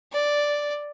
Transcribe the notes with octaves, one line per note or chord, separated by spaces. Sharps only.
D5